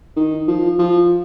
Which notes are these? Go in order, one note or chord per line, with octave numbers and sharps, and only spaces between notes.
D#3
F3
F3